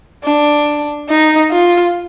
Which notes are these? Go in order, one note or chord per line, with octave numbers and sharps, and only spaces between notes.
D4
D#4
F4